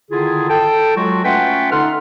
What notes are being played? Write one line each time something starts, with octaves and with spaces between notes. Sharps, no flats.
D3 D#3 E4 F4 G#4
A4 G5 A5
F#3 G#3 F4 F#4
A3 C#4 F4 B4 F#5 G5
D3 D#4 A4 F#5 C6 F6